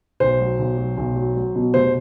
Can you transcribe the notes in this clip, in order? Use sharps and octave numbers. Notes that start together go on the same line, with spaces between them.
B1 C5
F#3
B1
F#3
B1
F#3
F#3
B2
F1 C5